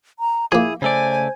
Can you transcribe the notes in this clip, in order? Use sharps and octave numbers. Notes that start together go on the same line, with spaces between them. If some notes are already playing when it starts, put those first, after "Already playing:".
A#5
F3 A#3 E4 G#4
C#3 A3 C5 D5 G#5